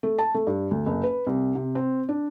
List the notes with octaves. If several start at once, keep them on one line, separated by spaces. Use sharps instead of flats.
A3
A5
A3
G2
D2
F#1
B4
C2
C3
C4
D4